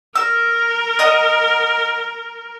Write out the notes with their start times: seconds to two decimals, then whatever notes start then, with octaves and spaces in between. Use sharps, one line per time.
0.15 A#4 E6
0.99 D#5 F#5 D#6